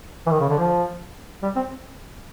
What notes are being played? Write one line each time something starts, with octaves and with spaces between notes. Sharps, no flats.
E3
D#3
C#3
D3
F3
G3
C4